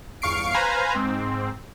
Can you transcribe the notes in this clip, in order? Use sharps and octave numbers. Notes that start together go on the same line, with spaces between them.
G1 E2 F5 C#6 C7 D7
B4 C5 F5 G#5 A#5
G#2 C4